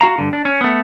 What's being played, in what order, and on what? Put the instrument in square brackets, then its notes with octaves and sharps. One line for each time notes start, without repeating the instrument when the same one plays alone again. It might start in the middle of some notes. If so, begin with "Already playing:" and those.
[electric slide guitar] F#4 F5 A#5
G2 D3
D4
C#4
A3 B3